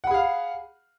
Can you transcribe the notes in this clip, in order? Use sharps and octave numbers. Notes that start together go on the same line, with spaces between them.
G#4 F5 F#5 B5